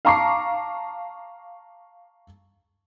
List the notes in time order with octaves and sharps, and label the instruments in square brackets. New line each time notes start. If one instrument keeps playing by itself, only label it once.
[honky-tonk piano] F5 A5 A#5 C#6 D6 C7